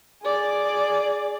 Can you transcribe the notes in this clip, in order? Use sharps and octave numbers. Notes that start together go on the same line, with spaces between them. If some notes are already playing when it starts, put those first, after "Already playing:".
G#4 D5